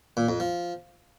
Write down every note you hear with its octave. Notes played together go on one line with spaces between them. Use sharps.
A#2
F2
F3